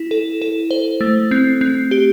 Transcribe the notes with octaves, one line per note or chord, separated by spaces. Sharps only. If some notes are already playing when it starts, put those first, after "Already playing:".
Already playing: E4
A4
A4
C5
A3
C4
C4
G4